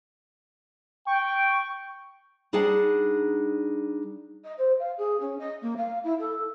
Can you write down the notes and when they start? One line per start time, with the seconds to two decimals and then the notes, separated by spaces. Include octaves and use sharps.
1.07 G5 C#6
2.53 G3 D4 D#4 G#4 F#5 A5
4.44 D#5
4.58 C5
4.79 F5
4.97 G#4
5.20 C#4
5.39 D#5
5.61 A#3
5.77 F5
6.04 E4
6.19 A4